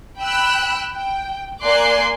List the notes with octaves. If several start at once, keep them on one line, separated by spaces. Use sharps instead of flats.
G5 B5 E6 F#6
G5
A#3 D5 G#5 C6 D6 F#6